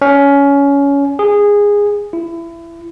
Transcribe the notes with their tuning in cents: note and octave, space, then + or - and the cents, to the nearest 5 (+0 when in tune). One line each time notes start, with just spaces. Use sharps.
C#4 +20
G#4 -15
E4 +25